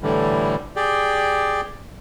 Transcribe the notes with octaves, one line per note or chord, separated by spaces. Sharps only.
A2 D3 E3 G3
G4 G#4 D5 G5